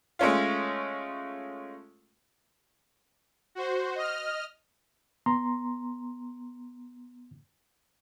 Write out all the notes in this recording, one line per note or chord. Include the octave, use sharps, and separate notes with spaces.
G#3 A3 C#4 F4
F#4 C5
D#5 F6
B3 A#5 C6